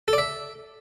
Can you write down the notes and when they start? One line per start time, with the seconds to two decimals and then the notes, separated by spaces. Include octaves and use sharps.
0.08 A4
0.13 D5
0.18 E5